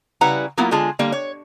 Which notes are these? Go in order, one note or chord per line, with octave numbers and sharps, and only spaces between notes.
C#3 G3 E4 B4 F#5 A#5
F#3 A#3 B3 E4 F4
D3 G#3 F4 G#4 A5
D3 G3 A#3
C#5